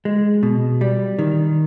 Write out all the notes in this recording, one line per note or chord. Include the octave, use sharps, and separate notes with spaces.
G#3
B2
G3
D#3